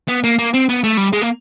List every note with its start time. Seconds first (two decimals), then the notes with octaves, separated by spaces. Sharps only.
0.08 B3
0.24 A#3
0.39 A#3
0.54 C4
0.69 B3
0.84 A3
0.97 G3
1.13 G#3
1.22 A#3